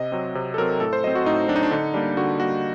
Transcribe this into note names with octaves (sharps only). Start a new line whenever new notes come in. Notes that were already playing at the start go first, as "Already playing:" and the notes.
Already playing: C3 D#5
F#3 C4
C3
A4
F#3 C4 A#4
A2 A4
C5
F#3 C4 D#5
F#4
A2 D#4
F#3 C4 D4
D#4
D4
D3 D#4
G3 A#3 D4
D3 F#4
G3 A#3 F#4